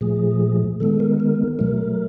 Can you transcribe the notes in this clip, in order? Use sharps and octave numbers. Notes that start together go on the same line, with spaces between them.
A#2 F3 A3 G#4
D#3 G#3 B3 A4
A#4
A#4
B2 F#3 A3 A#4